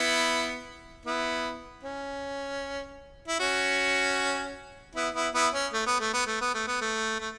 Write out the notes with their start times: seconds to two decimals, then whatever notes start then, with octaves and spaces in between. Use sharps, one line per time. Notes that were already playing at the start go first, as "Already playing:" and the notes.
Already playing: B3 E4
1.06 B3 E4
1.83 C#4
3.28 E4
3.39 C#4 F#4
4.95 B3 E4
5.15 B3 E4
5.34 B3 E4
5.54 C#4
5.73 A3
5.86 B3
6.00 A3
6.14 B3
6.27 A3
6.41 B3
6.54 A3
6.67 B3
6.81 A3
7.20 A3